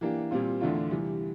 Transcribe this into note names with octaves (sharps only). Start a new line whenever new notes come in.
E3 A#3 D4 G4
A#2 G3 C4 F4
E2 D3 A3 D4 F4
C3 E3 G3